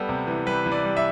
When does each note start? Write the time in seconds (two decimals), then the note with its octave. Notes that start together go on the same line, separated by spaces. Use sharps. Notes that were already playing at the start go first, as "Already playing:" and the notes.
Already playing: G3 B3 A4
0.09 C3
0.27 E3
0.46 G3 B4
0.66 E3
0.71 D5
0.85 G3
0.97 E5